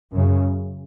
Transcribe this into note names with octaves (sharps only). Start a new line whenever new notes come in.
F#2 C#3